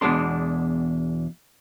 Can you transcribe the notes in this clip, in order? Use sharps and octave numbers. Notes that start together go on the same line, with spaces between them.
E2 B2 G#3 D4 C6